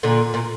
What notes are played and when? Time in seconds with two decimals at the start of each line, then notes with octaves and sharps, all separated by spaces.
0.03 A#2 D3
0.34 A#2